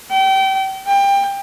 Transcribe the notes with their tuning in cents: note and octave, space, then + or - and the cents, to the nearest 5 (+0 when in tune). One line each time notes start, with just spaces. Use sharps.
G5 -30
G5 +20